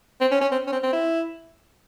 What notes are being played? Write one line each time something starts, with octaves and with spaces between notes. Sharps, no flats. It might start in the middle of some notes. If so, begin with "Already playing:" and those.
C4
C#4
C#4
C4
C#4
C4
C4
E4